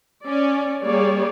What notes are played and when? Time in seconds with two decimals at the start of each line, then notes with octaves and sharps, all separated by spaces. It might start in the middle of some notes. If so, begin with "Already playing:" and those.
0.24 C#4 D5
0.83 G3 A#3 G#4 C#5 D5